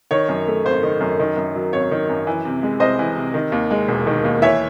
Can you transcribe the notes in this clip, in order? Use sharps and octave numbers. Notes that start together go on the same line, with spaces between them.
D#3 C#5
F#2
A3
G#1 C5
D#3
F#2
D#3
F#2
F#3
G#1 C#5
D#3
F#2
E3
C3
G#3
C2 C5 D#5
E3
C3
D#3
D#2
G#3
E1
D#3
D#2
E3 C#5 E5